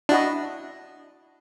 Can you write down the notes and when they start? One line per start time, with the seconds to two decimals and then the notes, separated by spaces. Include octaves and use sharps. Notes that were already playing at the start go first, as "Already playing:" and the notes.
0.09 D4 E4 F#4 D#5